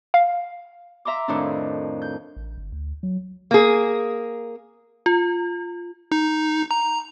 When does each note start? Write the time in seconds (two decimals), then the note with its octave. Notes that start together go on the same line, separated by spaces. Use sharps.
0.14 F5
1.05 E5 A#5 C6 D6
1.28 F2 A2 D#3 D4
2.02 G6
2.36 A1
2.58 G1
2.72 D2
3.03 F#3
3.51 A#3 G#4
5.06 F4
6.12 D#4
6.71 A#5